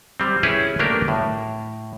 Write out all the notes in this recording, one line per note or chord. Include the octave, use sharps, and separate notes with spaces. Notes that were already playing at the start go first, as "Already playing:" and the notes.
G3 C4
C#4 E4 G4 G#4 B4
A3 A#3 D4 F#4 G4 A#4
A2